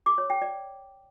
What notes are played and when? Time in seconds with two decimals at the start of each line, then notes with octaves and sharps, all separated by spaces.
0.06 D6
0.18 C#5
0.30 G5
0.42 D5